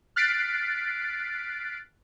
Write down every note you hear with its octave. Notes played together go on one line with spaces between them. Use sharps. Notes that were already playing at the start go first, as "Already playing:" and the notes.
F6 F#6 A6 B6 C7 D7